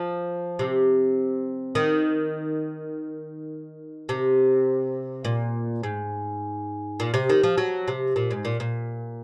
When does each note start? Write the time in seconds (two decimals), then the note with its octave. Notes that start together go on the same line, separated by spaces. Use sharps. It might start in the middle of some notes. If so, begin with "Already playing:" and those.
Already playing: F3
0.59 C3
1.75 D#3
4.09 C3
5.25 A#2
5.83 G#2
7.00 A#2
7.14 C3
7.29 D#3
7.43 F3
7.58 F#3
7.88 C3
8.16 A#2
8.31 G#2
8.45 A#2
8.60 A#2